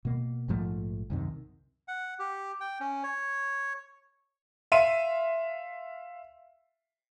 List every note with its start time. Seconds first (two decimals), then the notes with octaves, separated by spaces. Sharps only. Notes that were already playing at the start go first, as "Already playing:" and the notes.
0.05 B2 A#3
0.48 A#1 G#2 F3 A3
1.10 C2 F#2 C3 D#3
1.88 F#5
2.19 G4
2.60 G5
2.80 C#4
3.03 C#5
4.72 E5 F5 C6 D#7